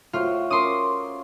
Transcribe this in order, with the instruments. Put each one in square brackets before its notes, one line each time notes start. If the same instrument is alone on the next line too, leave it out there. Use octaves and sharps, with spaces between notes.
[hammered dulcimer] A2 F#4 C5 [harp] F4
[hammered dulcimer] C#4 F4 A#4 [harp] C6 D6 D#6